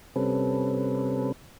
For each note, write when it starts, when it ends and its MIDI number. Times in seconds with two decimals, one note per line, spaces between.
0.16 1.32 48
0.16 1.32 55
0.16 1.32 60
0.16 1.32 61
0.16 1.32 69
0.16 1.32 71